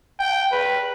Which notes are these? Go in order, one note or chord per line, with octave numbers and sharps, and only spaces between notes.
G5
B4